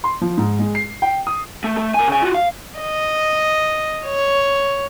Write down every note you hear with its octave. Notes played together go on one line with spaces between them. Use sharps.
C6
F3
G#2
G#3
C7
G5
D#6
A3
A3
A#4 G#5
C#3 G#5
F4 F#4
F5
D#5
C#5